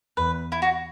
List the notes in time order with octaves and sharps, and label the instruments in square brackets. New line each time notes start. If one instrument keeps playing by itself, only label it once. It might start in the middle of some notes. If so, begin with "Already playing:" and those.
[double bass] E2 [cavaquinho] B4
[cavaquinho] E4
F#4